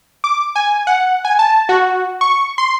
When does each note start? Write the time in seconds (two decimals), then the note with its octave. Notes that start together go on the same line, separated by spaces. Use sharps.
0.24 D6
0.56 G#5
0.87 F#5
1.25 G#5
1.39 A5
1.69 F#4
2.21 C#6
2.58 C6